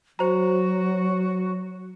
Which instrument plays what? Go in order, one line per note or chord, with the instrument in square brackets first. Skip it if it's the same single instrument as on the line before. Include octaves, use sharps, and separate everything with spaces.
[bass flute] F#3 [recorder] F#4 [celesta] C5 A#5